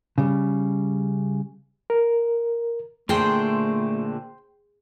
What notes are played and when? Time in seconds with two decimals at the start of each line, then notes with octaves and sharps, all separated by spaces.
0.18 C#3 G3
1.90 A#4
3.09 A#2 D3 A3 D4 G#4 C5 G5